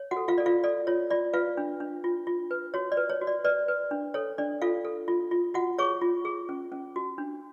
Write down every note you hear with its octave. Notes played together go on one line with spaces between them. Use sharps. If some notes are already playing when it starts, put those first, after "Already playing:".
Already playing: C#5
F#4 F#5
A4
F4 F5
A4 D5
F4 F5
A4 D5
F4 C#5
F4 D5
F4 B4 F5
D4
D4
F4
F4
B4
F#4 C#5
D5
B4
C#5
F#4
D5
B4 D5
B4
D4
A4 C#5
D4 D5
F4 A4 F5
A4
F4
F4
F4 F#4 F#5
G#4 C#5 C#6
F4
G#4
C#4
C#4
F#4
D4